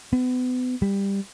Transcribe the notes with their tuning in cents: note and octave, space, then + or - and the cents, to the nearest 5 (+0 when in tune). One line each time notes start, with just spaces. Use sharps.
B3 +35
G3 +15